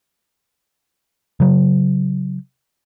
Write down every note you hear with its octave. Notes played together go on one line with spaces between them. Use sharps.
C#3 F#3